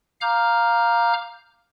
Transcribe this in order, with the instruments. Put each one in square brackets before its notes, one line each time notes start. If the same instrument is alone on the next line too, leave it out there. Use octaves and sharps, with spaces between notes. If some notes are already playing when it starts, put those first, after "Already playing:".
[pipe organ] F5 A#5 D6 F6 G6